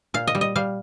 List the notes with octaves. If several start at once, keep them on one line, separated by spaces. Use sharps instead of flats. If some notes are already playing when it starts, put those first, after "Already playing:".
A#2 F5
D#5
G3
D#5
G3 F5